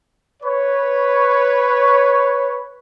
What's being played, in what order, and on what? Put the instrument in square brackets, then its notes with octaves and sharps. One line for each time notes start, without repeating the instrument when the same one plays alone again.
[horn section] B4 C#5